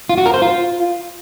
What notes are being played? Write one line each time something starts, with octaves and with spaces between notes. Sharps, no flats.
F4
F#4
A#4
C5
F4